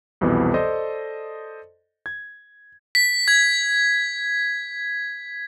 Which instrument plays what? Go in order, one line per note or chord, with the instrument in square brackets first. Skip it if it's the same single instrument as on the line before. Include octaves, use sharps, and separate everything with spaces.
[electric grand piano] C2 F2 B2 E3 B3
A4 C5 D5 D#5
G#6
[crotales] B6
G#6